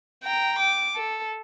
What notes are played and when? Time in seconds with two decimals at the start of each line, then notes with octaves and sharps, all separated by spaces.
0.23 G5 A#5
0.59 D6
0.95 A4